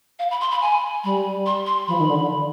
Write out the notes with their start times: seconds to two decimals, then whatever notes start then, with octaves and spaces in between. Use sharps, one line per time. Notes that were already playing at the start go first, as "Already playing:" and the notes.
0.19 F5
0.31 B5
0.41 C6
0.51 B5
0.61 G#5
1.04 G3 B5
1.46 C6
1.66 C6
1.87 F3 B5
1.98 D#3
2.08 D3